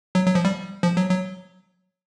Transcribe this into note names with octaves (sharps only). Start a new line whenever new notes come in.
F#3
F#3
F3
G3
F3
F#3
F#3